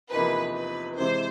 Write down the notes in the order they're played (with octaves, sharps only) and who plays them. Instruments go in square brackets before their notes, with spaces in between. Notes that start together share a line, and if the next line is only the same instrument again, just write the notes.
[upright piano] E2 C3 F3 A#3 D#4 [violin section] B4
[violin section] B4
[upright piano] C3 E3 G#3 C4 [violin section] C5